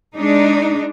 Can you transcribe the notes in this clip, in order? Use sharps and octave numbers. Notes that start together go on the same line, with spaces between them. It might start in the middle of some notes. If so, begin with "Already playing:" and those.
G#3 D4 D#4